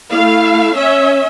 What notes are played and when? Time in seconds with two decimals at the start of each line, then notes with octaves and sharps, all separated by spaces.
0.11 A3 E4 F5
0.77 C#4 C#5 E5